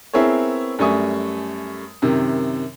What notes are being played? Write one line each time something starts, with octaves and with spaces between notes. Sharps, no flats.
B3 C4 E4 G#4 A#4 C#5
F#2 G3 A3 G#5 C#6 D#6
F#2 C3 D#3